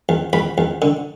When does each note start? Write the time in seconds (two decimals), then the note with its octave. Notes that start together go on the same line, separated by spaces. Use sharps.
0.09 E2
0.33 E2 B5
0.58 E2
0.82 D3